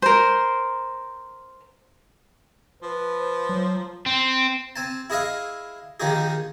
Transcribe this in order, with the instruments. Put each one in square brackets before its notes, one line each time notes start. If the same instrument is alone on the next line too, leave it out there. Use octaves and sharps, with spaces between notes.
[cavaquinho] A#4 C5
[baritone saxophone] F3 [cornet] B4
[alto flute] C5
[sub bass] F#3
[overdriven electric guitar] C4
[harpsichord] C4 G#5 A5
E4 G#4 D#5 F5
A#1 D#3 F3 D#4 G4 G#4